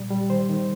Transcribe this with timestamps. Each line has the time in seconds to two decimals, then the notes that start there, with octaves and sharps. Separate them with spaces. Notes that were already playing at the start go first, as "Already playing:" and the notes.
Already playing: A#2 G3 D5
0.10 G3
0.30 D#3 C5
0.49 D#3